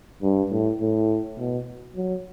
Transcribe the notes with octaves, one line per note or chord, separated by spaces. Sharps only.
G2
A2
A2
B2
F#3